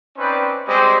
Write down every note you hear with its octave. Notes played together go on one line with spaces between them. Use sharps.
C4 C#4 D#4 B4 C5 D5
G3 G#3 C4 C5